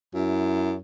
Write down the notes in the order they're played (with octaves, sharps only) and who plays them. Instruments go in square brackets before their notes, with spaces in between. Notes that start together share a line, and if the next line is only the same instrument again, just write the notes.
[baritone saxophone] F#2 [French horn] E4